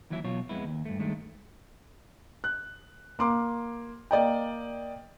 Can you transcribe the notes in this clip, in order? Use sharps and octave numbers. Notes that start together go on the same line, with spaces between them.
D#2 E3 F#3 E4 E5
B2 F#3 F4 C#5
F2 G#3 B3 E4
D#2
G2 A3
G2 D#3 G#3 A3
F#6
A#3 C6 D6
A#3 D5 D#5 G5